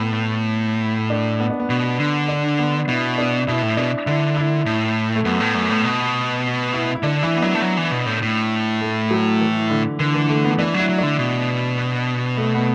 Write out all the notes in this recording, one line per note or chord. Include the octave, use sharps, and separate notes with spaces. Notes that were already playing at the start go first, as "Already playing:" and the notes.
Already playing: A2 B3
D4
B3
D4
B3
B2
D3
D4
B3
B2 E4
D4
B2 E4
A2
B2 D4
D3 E4
E4
A2
A3
F#2 B3
A2
F#2
A2
B2
E4
E4
D3 D4
E3 E4
B3
F#3 D4
A3
F#3
E3
B2
A2
A2
A3
F#3
E3
D3
D3 E3
E3
A3
B3
E3 D4
F#3 E4
F#3
D3 D4
B2
A3
B3